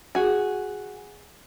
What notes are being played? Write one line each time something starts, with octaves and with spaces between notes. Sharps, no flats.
F#4 G#4